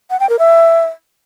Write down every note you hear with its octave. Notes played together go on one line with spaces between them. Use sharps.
F#5
G5
A#4
E5